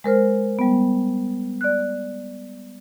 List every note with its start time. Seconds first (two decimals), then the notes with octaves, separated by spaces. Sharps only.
0.04 G#3 A#4 C5 F6
0.59 G3 B3
1.61 D5 F#6